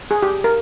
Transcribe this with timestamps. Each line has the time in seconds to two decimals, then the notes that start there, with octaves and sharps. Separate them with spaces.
0.11 G#4
0.22 G4
0.44 A#4